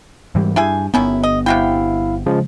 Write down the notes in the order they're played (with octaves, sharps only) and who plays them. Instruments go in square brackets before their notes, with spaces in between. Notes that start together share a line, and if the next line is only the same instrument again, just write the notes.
[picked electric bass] G#2 E3 G3
[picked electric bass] G2 [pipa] E4 G#4 G#5
[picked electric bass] G1 B3 [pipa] D#3 C#4 E4
[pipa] D#5
[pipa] C3 F#4 G5 [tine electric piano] E4 F5
[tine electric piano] C#3 F3 G#3